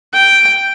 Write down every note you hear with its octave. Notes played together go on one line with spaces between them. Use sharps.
G5